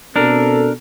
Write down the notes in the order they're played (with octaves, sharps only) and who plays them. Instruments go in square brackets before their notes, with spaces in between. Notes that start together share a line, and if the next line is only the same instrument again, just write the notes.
[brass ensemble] B2 C4 A4 [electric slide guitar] D4 A#4